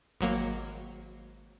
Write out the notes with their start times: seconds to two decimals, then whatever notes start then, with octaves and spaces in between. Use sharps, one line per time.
0.21 G#1 F#3 A#3